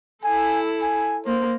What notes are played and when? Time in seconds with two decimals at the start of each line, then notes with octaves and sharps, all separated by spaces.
0.24 E4 A4 G#5
0.82 G#5
1.26 A#3 C5